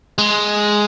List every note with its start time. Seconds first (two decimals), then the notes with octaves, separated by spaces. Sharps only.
0.18 G#3